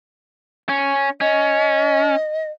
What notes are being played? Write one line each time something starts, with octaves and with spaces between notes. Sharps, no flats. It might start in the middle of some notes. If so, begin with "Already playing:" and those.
C#4
C#4 D#5